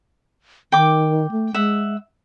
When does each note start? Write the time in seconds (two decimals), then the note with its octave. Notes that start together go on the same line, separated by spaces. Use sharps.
0.72 D#3 G5 D6
1.31 A3
1.54 G#3 E5 F#5